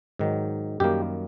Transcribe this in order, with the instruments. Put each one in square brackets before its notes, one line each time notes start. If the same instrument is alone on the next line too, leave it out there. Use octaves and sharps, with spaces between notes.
[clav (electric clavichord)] G#2 D#3 F#3
F#2 D#3 G3 A#3 G4